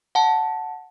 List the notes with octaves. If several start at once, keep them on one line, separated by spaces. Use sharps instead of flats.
F#5 A5